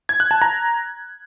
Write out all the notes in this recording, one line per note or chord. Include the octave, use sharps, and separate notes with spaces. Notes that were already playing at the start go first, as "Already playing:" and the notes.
G#6
F#6
A5
A#5